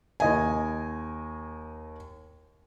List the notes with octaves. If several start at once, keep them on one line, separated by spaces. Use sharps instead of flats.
D#2 D#5 G#5